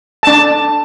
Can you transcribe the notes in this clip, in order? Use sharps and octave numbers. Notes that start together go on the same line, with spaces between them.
D4 A5